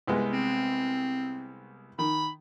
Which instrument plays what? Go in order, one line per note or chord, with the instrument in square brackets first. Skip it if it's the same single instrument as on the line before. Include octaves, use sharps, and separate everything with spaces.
[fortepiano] C2 G#3 B3
[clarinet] C4
[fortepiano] D#3 [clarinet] B5